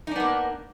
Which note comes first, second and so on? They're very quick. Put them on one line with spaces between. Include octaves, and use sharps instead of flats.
D#4 D4 B3 A#3